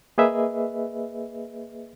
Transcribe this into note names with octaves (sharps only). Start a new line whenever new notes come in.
A#3 G#4 B4 D#5 E5